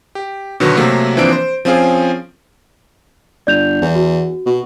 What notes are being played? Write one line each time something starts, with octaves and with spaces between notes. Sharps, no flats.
G4
B2 D3 D#3 F#3 B3
C3 F#3 A3 A#3 C4
E3 F3 A#3 C4 D4 D7
C5
F3 C4 C#4 F4 G#4
G1 D5 G6 F7
E2
F#4
B2